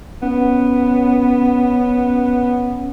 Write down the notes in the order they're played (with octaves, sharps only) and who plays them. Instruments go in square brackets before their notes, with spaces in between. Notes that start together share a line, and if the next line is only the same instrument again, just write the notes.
[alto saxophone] B3 [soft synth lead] C#4